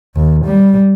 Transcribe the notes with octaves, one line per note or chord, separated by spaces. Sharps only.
D#2
G3